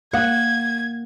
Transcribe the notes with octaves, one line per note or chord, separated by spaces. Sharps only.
A#3 F5 F#5 D#6 G#6